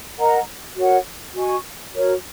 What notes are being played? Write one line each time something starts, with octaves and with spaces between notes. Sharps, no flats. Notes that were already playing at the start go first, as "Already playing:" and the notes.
A#4 D#5 F#5 A#5
F#4 A#4 C#5 F#5
F#4 D#5 G#5 C#6
F#4 A#4 C#5